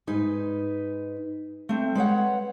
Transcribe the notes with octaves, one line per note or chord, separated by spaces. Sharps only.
G#2 D#4 B4 G#5
A3 C4
G#3 B4 C#5 F#5